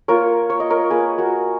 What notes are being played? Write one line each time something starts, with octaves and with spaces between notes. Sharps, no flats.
A#3 F4 A#4 C#5
C#5
D#5
A#4 C#5
A#3 F4 G#4 B4
F#4 A#4